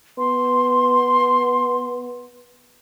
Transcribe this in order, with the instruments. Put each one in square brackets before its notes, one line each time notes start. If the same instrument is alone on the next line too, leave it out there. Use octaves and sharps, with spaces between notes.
[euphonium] B3 [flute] C6